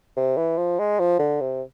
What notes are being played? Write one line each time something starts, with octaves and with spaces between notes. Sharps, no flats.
C3
E3
F3
G#3
F3
D3
C3